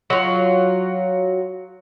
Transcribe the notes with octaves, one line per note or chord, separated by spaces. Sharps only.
F#3 F4